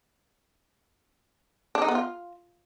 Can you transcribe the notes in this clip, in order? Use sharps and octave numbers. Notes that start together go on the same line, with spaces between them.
D4
D#4
B3
F4